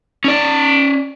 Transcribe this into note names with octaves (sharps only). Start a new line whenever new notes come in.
C#4 D5